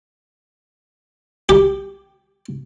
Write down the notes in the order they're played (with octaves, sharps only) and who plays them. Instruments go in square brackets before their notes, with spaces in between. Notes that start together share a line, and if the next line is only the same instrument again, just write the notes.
[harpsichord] G4